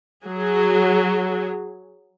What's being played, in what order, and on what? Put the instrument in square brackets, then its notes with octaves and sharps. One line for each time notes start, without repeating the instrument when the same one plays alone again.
[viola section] F#3 G#4